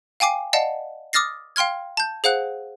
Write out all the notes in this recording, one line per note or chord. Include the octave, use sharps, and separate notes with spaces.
F5 G5 G#5 D6 C7
D5 D#5 F5 F#5 A5
D6 D#6 F6 A6 A#6 C7
F5 G5 C6 F6 G#6
A5 G6
G#4 C5 F5 F#5 F#6